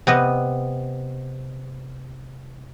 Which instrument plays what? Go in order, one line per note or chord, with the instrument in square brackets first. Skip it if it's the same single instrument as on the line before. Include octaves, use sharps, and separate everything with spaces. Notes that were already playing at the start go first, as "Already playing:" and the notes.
[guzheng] C3 B3 D#5